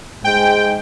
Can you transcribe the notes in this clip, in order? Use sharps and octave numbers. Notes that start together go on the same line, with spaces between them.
G#2 G#3 G5